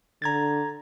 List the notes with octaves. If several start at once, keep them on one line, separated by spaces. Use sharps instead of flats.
D3 A#5 G#6 A6